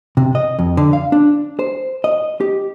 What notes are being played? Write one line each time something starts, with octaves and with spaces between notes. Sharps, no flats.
C3
D#5
F2
D3
F5
D4
C5
D#5
G4